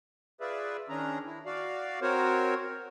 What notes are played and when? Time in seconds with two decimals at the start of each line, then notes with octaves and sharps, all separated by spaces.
0.40 F4 G#4 B4 D5 E5
0.89 D#3 C#4 D4 G#4 A#5
1.26 E4
1.46 F#4 D5 F5
2.02 C4 F#4 A#4 C5 C#5